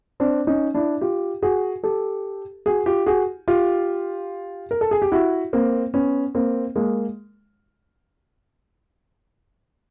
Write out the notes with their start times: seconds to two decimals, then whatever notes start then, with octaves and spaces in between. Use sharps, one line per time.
0.20 C4 D4
0.47 C#4 D#4
0.74 D4 E4
1.01 F4 G4
1.42 F#4 G#4
1.84 G4 A4
2.66 F#4 G#4
2.86 F4 G4
3.06 F#4 G#4
3.48 F4 G4
4.71 A#4
4.81 A4
4.91 G#4
5.02 G4
5.12 E4 F#4
5.53 A#3 C4
5.94 B3 C#4
6.35 A#3 C4
6.76 G#3 A#3